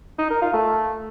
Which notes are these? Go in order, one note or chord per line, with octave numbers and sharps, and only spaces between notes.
D#4
A#4
F4
A3